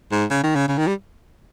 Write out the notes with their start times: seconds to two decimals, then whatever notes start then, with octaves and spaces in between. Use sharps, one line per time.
0.11 G#2
0.30 C#3
0.43 D#3
0.55 C#3
0.68 C#3
0.78 D#3
0.87 G3